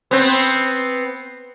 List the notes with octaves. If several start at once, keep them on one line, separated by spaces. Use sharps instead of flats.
B3 C4